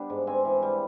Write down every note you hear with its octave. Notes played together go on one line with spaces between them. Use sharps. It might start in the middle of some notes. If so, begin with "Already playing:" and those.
Already playing: G3 B3 D4
G#2
C4 G#5
E3
G3